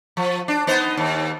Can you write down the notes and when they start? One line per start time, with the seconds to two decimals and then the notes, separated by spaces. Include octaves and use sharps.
0.17 F3
0.48 D4
0.67 B3 D#4 C5
0.97 D#2